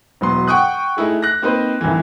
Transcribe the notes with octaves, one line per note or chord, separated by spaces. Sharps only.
E1 F#3 B3 C6
F#5 G5 C#6 D#6 F#6
A3 D#4 E4 G#4
F#6 A#6
A#3 C4 D#4 B4 C5
G1 C2 A2 D#3 E3